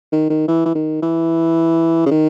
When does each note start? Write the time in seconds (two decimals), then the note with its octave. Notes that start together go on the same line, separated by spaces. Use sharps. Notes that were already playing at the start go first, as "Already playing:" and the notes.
0.12 D#3
0.30 D#3
0.48 E3
0.65 E3
0.75 D#3
1.02 E3
2.06 C#3
2.11 D#3